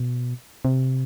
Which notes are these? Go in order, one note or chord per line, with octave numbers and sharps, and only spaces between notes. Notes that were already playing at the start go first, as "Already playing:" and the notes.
Already playing: B2
C3